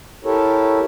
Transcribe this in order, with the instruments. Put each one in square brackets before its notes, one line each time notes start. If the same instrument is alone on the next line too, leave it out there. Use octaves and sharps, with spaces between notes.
[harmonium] E4 G4 A4 A#4 C#5